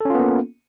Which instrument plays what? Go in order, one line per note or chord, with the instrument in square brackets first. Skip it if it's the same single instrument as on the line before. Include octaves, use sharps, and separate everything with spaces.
[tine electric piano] A4
C#4
F4
B3
A#3